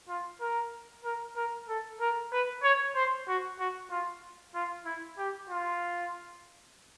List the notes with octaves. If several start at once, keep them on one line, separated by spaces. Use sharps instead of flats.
F4
A#4
A#4
A#4
A4
A#4
B4
C#5
C5
F#4
F#4
F4
F4
E4
G4
F4